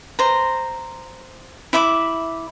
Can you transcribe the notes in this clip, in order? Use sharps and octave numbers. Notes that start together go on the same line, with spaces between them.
C5 A#5
E4 E5 B5 D6